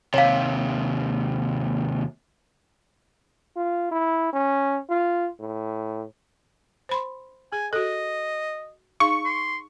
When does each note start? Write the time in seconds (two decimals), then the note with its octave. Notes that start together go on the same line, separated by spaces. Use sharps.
0.14 D#2 C3 C#5 F5
3.56 F4
3.91 E4
4.33 C#4
4.90 F4
5.40 A2
6.89 C5 B5 C6
7.52 G#4 G#5
7.73 F#4 A4 D#5
9.00 D#4 G#4 F5 C#6
9.25 C6